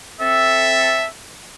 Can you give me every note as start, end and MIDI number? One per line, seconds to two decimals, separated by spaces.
0.21 1.05 60
0.21 1.05 69
0.21 1.09 76